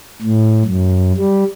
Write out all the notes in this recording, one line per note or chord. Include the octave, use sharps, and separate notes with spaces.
A2
F#2
G3